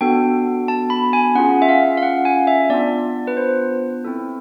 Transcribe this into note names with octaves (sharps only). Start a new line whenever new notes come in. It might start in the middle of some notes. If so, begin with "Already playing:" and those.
B3 D4 F#4 A4 G5
A5
B5
G#5
C#4 F4 G#4 F#5
E5
F5
F5
F#5
G#5
E5
B3 D4 F4 D5
B4
C5
C4 E4 A4